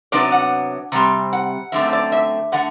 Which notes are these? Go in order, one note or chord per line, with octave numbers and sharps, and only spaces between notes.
C3 F#3 B3 D4 D5
F#5
C3 G3 C4
F#5
F#2 D3 A3 C4 E5
E5
D5
E5
D3 A3 F#5